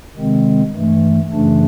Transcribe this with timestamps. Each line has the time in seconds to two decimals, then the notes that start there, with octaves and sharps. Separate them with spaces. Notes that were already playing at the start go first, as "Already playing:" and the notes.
0.16 C3 D#3 G#3 C4
0.73 G2 E3 A3
1.32 F#2 C#3 E3 A3 D4